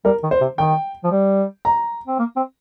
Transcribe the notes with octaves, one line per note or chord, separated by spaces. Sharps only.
G3 A#4
D#3
C5
C3
D#3 G5
F3
G3
A#5
C4
A#3
C4